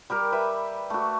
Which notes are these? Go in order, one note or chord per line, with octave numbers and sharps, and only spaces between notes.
G3 G4 A#4
B4 E5 G5
A3 F#4